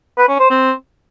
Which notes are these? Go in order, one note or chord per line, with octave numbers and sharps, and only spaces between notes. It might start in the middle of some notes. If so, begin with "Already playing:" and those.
B4
C#4
C5
C4